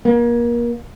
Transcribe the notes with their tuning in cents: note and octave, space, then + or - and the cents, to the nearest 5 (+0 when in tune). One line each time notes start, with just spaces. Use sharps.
A#3 +30